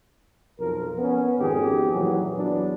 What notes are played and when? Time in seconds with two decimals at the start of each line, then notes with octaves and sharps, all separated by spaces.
0.60 B1 F2 F3 A#4
0.98 B3 C#4
1.39 G#1 F2 D#3 G4 G#4
1.93 A#2 E3 F#3
2.35 E2 F#3 B3 D4